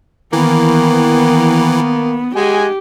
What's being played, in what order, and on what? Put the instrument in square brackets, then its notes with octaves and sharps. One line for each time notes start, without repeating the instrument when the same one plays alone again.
[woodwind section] D#3 [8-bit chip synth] E3 [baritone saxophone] A#3 [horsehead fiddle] B3
[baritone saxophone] G#3 [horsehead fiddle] G4 [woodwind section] D#5 F#5 G#5